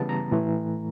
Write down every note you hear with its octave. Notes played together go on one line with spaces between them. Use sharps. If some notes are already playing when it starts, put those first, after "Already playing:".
Already playing: C#3 E3 G3 B3 A5
A#5
A2 E3 A3